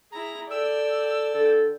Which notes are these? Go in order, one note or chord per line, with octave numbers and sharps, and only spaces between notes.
E4 G#4 A#5
A4 D5 G5 E6
D3 A4